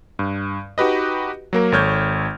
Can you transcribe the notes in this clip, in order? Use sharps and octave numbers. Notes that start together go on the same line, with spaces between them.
G2
D#4 F#4 G4 B4 D#5
F#3 A#3 A#4
G#1 A4 C#5 F6 G6 G#6